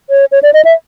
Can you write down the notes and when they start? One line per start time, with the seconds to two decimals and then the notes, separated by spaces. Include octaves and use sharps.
0.10 C#5
0.32 C#5
0.43 D5
0.54 D#5
0.65 E5